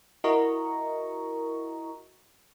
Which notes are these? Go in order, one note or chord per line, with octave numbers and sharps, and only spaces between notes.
E4 F#4 A#4 D#5 A#5 C#6